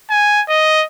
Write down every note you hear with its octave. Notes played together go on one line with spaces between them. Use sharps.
G#5
D#5